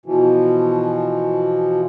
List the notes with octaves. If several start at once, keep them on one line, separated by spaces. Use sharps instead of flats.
B2 E3 F3